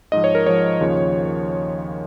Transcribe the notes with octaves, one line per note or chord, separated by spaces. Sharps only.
G#2 F3 D#5
C#5
A#4
G#2 F3 C#5
D#2 C#3 F3